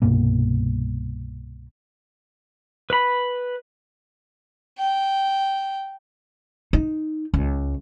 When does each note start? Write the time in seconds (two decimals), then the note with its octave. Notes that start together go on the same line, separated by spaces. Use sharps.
0.02 C2 G2 B2 A#3
2.90 B4 B5
4.78 G5
6.73 D#4
7.34 C#2